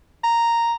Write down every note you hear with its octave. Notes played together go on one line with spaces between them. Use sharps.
A#5